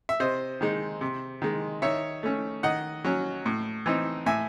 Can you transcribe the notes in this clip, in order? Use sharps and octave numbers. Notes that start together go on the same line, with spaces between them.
E5
C3 C5 D#5
D#3 G#3 D#4
C3
D#3 G#3
D#3 C#5 E5
A3 C#4
D#3 D#5 F#5
F#3 C#4
A2
E3 C4 D#4
A2 E5 G#5